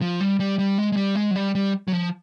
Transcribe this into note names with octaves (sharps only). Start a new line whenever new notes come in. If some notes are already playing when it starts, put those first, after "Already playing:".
F3
G3
G3
G3
G#3
G#3
G3
G#3
F#3
G3
G3
F#3
F3